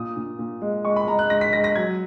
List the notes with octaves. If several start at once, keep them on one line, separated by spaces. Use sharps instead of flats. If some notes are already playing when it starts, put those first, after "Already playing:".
Already playing: A#2 D#6
A#2
A#2
G#3
G#3 C#6
B5
G#3 A#5
F#6
G#3 A#6
B6
G#3 A#6
A#6
F#3 G#6